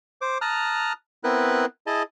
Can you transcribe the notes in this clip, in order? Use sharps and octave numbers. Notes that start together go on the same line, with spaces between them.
C5 D6
A5 A#5 D#6 F6 F#6
B3 C4 E4 A#4 B4 F#6
E4 G#4 D#5 A5